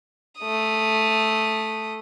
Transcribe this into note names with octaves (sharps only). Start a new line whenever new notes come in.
A3 D#6